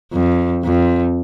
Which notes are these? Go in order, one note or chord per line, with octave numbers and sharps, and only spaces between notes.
F2
F2